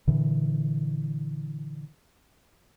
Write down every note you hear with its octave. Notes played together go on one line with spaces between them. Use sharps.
A#2 D3 E3